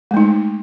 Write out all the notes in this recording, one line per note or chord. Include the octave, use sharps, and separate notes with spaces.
G#3 A3 D#4